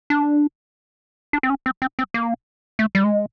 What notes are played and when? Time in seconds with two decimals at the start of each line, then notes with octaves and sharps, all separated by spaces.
0.10 D4
1.33 D4
1.43 C4
1.50 C#4
1.66 C4
1.82 C4
1.99 C4
2.14 A#3
2.79 A3
2.95 G3
3.04 G#3